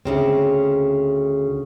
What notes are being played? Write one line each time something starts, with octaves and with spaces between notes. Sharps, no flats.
D2 C#3 C4